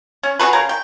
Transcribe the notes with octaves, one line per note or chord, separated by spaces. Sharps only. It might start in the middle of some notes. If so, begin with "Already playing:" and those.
C#4
F#4 G#4 A4 B4
C#3 G#4 A#4
G5